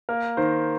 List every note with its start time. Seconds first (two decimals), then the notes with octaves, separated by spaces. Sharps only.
0.09 A#3 A#4
0.37 D#3 C5